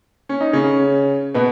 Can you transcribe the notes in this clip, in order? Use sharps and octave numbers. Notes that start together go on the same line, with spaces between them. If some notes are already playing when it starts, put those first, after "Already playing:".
C#4
D#4
C#3 C#4
B2 B3